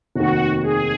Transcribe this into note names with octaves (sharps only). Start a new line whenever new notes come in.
F1 D#2 D#3 F#4
G#4